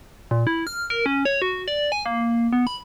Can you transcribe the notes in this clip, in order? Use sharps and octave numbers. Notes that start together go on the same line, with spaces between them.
A#2
E4
F6
A#4
C#4
C#5
F#4
D5
G#5
A#3
B3
B5